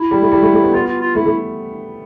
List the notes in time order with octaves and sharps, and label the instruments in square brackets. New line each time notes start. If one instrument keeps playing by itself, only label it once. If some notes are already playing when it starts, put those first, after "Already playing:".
Already playing: [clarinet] E4
[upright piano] G3
A3
G3
A3
A3
B3
[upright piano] B3 [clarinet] F4
[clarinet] F4
F4
[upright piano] A3 [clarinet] E4
[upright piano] A3